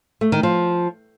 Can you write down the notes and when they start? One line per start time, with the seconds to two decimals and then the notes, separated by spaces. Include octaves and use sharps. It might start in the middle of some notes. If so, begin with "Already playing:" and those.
0.21 A3
0.32 D#3
0.43 F3